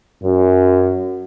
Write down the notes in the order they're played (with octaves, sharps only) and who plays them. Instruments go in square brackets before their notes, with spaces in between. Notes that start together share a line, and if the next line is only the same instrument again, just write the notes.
[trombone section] F#2